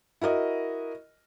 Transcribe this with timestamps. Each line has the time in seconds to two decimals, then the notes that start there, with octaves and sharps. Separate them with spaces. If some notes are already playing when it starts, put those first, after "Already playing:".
0.21 E4 F#4 A#4 D#5